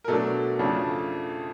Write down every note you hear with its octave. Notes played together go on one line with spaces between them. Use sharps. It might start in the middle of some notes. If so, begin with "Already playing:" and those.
A#4
B2 F#3 A3 D4 A4
F2 C#3 F3 A3 D4